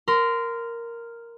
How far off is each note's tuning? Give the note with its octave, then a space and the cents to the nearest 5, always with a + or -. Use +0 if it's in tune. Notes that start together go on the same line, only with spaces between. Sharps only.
A#4 +0 C6 -25